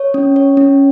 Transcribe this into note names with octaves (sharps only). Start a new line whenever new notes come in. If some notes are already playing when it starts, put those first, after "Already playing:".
Already playing: C#5
C#4
C#5
C#4